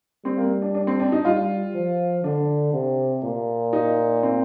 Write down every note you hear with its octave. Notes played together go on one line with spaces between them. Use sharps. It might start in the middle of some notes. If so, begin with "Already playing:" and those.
G3 C4
A#3
D4
D4
C4
D4
D#4
G3 F4
F3
D3 D4
C3
A#2
D#4
C4